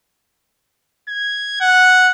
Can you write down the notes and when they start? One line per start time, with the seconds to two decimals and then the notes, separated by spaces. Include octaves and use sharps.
1.08 G#6
1.60 F#5